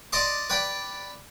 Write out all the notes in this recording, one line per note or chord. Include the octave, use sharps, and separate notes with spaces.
D5 D#5 A5 C6 D6
B4 D5 G5 B5